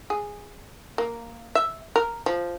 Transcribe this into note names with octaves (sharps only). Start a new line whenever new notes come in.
G#4
A#3
E5
A#4
F3